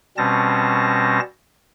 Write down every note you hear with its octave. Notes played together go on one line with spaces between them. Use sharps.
B2 G3 C4 C#4 A5 A#6